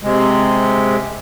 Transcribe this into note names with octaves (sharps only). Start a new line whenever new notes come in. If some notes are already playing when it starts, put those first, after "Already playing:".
C3 G#3